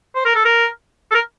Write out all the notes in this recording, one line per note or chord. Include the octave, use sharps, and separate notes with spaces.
C5
A#4
A4
A#4
A4
A#4